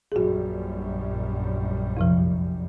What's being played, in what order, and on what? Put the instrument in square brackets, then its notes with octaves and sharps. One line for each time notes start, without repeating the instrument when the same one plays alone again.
[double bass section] A#1 F#2 G3 [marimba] F#4 G#4
[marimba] F2 C3 F3